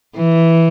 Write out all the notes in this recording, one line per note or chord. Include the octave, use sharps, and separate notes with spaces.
E3